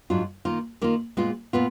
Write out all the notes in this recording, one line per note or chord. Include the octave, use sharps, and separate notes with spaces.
G#2 F#3 D4 F4
D#3 A#3 F4
D#3 A#3 F4
A#2 G#3 B3 F4
A#2 B3 F4